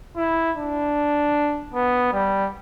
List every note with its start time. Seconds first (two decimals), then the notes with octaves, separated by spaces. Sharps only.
0.17 E4
0.57 D4
1.74 B3
2.13 G3